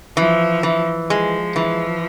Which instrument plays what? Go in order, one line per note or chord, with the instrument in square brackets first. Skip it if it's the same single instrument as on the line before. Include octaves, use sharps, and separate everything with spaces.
[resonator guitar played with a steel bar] E3 [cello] F3
[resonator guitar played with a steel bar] E3
[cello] F3 [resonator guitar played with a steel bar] G#3
[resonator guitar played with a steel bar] E3